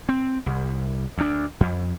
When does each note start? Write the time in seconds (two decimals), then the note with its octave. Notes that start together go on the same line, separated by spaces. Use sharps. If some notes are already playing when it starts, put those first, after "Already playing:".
0.09 C4
0.46 C2
1.18 D2 D4
1.61 F2